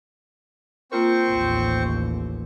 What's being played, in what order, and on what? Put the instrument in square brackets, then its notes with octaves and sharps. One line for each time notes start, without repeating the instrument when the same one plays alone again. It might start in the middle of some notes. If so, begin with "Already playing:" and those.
[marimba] A#3 F4 A#4 [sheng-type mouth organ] C4 C5 C#6
[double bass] A1 D#2